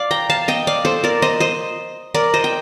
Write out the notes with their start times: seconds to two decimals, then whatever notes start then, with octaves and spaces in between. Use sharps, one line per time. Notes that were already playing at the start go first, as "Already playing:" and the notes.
Already playing: D5 F5
0.11 G5 A#5
0.30 F5 A5
0.48 D#5 G5
0.67 D5 F5
0.85 A4 C5
1.04 A#4 D5
1.22 C5 D#5
1.40 C5 D#5
2.14 A#4 D5
2.34 C5 D#5
2.44 G5